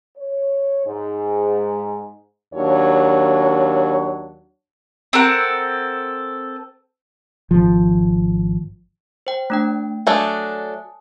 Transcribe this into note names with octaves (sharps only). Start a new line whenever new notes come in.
C#5
G#2
D#2 F#3 D4 C#5
C4 A4 A#4 F#5
G#1 F3
C5 G5
A3 D4 G5
F#3 A3 D4 G#5 A5 D#6